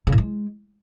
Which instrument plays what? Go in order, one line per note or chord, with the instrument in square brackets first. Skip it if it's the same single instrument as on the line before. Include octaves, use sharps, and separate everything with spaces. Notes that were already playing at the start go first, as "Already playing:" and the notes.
[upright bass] C#3
A2
G#3